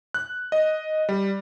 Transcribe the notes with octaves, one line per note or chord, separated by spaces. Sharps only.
F#6
D#5
G3